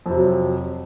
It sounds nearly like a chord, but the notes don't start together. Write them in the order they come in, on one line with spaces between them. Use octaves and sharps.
F2 C3 F#3